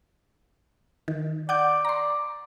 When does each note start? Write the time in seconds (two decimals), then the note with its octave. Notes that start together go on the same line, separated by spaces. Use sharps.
1.08 D#3
1.49 D5 F#5 D6 G6
1.85 D5 A#5 C6